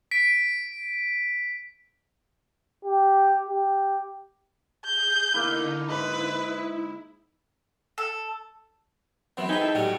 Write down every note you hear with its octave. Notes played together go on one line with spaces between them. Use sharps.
B6 D7
G4
G4
G#4 G6
D3 A#3 D#4 E4
G#2 E4 B4 B5
A4
F#2 E3 B3 C4
C4 D#4 G#4 B4 G#5
E4 G4 A4
A2 F#3 G3 D4 G#5